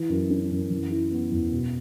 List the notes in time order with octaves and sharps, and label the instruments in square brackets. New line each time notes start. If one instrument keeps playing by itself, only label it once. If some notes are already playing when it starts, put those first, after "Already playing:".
Already playing: [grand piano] E3
F#2
C#4
F#2
E3
E4
B3
E2
B2